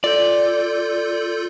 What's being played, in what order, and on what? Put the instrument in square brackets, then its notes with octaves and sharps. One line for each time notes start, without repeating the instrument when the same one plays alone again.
[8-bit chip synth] F4 A4 G6 [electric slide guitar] D5